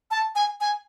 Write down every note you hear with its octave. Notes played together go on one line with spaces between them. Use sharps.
A5
G#5
G#5